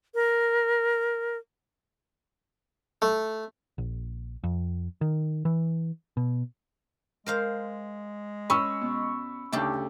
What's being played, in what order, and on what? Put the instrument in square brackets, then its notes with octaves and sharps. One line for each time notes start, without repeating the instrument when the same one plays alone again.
[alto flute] A#4
[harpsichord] A3
[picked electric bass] A#1
F2
D#3
E3
B2
[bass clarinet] G#3 [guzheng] A#4 C5 F5
[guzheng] C#4 [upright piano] B5 C#6 E6
[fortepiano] B2
[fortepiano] D2 [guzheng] C#3 G4 A4 [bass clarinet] D#4